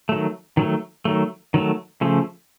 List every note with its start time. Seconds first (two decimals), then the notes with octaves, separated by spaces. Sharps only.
0.09 D#3 F#3 A3
0.57 D#3 F#3 A3
1.05 D#3 F#3 A3
1.54 D#3 F#3 A3
2.01 C#3 F3 A3